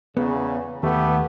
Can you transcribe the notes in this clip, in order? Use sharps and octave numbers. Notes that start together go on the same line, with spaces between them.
E2 C#3 B3
D#2 A3 B3 G4